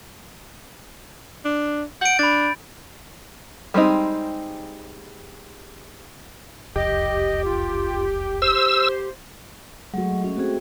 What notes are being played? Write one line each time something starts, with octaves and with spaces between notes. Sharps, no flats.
D4
F#5 G6 D7
D4 B5 A6
G3 G#3 C4 D#4
E1 C2 F2 G4 D#5
F4
G4 C5 E6
F#3 G#3 A3 F#4
A3
C#4 F#4
A3 C4 F#4 G#4